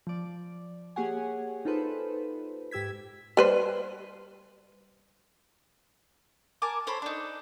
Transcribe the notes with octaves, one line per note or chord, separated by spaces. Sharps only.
F3 D5
A#3 G4 G#4 C#5 F#5 G#5
D#4 F4 A4 B4 C5
G#2 G4 E6 G#6 B6
G3 B4 C5
A#4 G#5 A5 D6
A4 C5 C#5 B5
D4 D#4